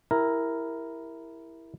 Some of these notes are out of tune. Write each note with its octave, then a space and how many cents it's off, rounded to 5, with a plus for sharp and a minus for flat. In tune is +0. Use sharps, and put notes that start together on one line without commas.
E4 +0 G4 +40 A#4 +0